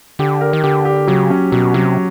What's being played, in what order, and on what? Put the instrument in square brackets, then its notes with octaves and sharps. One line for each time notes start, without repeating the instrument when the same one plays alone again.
[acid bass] D3 [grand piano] G4
[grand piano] A#4
[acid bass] D#3
[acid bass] D3 [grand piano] G4
[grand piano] G4
[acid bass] C#3 [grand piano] F#3
[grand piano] C#4
[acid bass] B2 [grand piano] F#3
[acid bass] C3 [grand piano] F#3